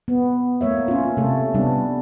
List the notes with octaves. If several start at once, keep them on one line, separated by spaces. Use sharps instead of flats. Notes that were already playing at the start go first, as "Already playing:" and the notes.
B3
A3 A#3 C#5 E5
C#4 F4
C3 A3 A4
C3 G3 B3 D4